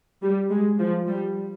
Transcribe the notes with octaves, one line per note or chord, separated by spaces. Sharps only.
G3
G#3
F3
G3